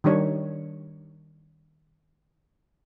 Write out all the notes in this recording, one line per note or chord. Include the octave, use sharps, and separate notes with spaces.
D#3 G3 D4 C#5